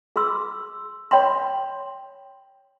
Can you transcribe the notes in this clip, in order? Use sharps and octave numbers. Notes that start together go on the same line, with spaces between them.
G#4 B5 C6 E6
C#5 G5 B5 C6